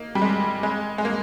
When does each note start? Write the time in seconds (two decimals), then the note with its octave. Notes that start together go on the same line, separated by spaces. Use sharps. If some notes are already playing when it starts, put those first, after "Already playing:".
Already playing: A#3 D#4
0.15 G3
0.22 G#3
0.63 G#3
0.98 G#3
1.05 A#3